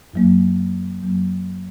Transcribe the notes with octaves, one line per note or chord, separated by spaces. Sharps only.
F#2 F#3 A#3
F#2 F#3 A#3